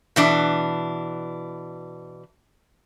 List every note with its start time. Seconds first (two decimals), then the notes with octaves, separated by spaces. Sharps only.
0.16 B2 E3 D4